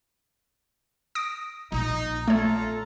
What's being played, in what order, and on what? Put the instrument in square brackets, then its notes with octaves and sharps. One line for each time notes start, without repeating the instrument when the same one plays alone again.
[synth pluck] D#6 A#6 D7
[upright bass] A#1 [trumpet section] D#4
[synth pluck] A3 C#5 [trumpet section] F4 A4 A#5